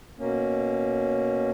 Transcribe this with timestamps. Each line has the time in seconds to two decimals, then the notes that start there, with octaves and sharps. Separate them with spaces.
0.19 B2 A#3 C#4